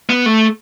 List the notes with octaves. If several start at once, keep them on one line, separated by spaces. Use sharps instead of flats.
B3
A3